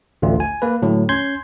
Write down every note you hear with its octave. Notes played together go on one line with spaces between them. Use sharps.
A1 D2 A3 F4
G#5
A#3 B4
A2 D3 F#3
C#4 C6 G6 G#6